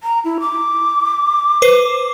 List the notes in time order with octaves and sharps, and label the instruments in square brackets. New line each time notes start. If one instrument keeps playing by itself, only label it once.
[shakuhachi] A#5
E4
D6
[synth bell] B4 C5 C7